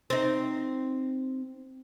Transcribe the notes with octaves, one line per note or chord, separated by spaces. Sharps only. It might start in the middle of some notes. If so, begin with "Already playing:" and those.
C4 D#4